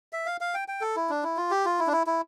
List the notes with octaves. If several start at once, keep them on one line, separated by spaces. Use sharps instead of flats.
E5
F5
F5
G5
G5
A4
E4
D4
E4
F4
G4
F4
E4
D4
E4
E4